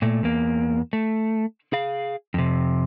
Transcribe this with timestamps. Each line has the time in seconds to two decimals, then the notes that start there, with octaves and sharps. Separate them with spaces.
0.02 A#2 A3
0.23 E2 A#3
0.93 A3
1.73 G#4 F5
2.34 F2 C3